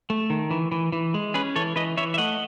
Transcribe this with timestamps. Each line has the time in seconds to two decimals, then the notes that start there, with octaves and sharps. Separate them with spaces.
0.10 A3
0.30 D#3
0.51 E3
0.72 E3
0.92 E3
1.14 G#3
1.34 C#4 G#4 B4
1.56 E3 A4 C#5
1.76 E3 B4 D#5
1.97 E3 C#5 E5
2.14 E5
2.18 A3 D#5 F#5